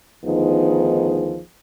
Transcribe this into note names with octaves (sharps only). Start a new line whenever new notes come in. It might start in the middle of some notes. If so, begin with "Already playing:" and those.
D2 D#3 F3 B3 D#4 G#4